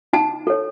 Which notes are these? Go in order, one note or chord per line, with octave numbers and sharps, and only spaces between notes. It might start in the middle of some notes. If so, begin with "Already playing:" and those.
D#4 A5
A4 C#5